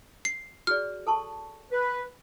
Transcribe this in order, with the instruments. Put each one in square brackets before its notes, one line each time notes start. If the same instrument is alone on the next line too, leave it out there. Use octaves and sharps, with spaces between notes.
[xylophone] C7
[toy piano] F#4 G#4 D5 [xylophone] F6
[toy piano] A4 A5 C#6
[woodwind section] B4